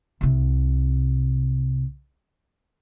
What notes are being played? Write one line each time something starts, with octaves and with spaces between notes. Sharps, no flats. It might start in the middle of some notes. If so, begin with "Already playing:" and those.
C2 C3